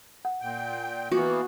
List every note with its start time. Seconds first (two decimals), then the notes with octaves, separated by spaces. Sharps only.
0.25 F#5
0.41 A#2 G5
1.12 E3 A#3 B3 F#4